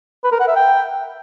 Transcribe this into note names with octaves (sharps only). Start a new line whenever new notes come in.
B4
A#4
F#5
E5
G5